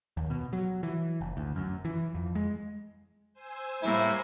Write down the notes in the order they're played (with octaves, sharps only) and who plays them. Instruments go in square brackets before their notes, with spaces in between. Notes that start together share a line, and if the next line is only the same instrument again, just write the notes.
[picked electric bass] D#2
B2
F#3
E3
F#1
D2
F#2
E3
F2
G#3
[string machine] C5 G#5 E6
[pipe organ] A2 [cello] G3 A#3 [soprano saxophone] E4